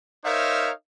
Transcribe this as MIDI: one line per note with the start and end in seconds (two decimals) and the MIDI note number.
0.25 0.71 63
0.25 0.71 70
0.25 0.71 72
0.25 0.71 73
0.25 0.71 76
0.25 0.71 77